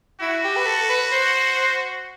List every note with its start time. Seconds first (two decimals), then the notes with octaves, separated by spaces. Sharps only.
0.21 E4 F#4
0.44 G4
0.56 B4
0.66 A4
0.89 B4
1.12 C5